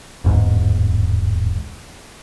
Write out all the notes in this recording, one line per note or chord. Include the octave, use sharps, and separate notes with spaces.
D1 E2 G#2